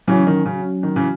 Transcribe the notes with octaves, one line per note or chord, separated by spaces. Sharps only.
C#3 E3 F#3 C#4 F#4
D#3
C#3
D#3
C#3 E3